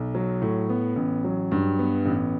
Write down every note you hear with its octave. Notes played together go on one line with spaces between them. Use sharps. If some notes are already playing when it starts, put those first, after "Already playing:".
Already playing: B1
F#3
A2
B3
A1
F#3
G2
B3
A1